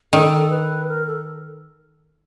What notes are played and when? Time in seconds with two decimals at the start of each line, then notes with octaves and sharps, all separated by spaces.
0.13 D#3 A4
0.50 B4
0.88 A#4
1.07 A4